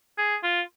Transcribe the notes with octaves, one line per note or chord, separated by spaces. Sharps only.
G#4
F4